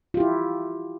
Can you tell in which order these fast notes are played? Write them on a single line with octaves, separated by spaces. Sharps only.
F4 G4 E4